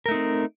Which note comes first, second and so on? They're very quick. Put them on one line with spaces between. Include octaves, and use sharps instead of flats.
A#4 A3 D#4 C4